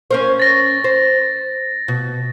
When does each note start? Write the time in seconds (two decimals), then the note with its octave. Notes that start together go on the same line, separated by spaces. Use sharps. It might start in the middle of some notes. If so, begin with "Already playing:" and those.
0.11 C#4 A#4 C5
0.40 A6 A#6
0.84 C5
1.88 B2